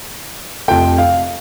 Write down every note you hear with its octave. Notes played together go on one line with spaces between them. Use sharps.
F2 C3 F3 A3 G5
F5